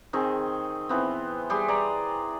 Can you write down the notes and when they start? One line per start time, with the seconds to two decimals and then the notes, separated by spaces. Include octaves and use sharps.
0.13 D#3 C4 G#4 C#6
0.89 E3 B3 C4
1.50 G3 G4 G#4 C6
1.68 D5 G#5 A#5